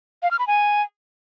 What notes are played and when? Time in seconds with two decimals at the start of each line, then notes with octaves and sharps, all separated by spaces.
0.23 F5
0.31 F6
0.39 B5
0.47 G#5